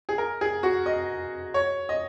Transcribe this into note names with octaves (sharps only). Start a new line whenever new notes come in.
G#4
A#4
G#4
F#4
D#5
C#5
D#5